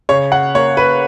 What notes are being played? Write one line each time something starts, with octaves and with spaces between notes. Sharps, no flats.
C#3 C#5
F#5
A#3 C#5
B4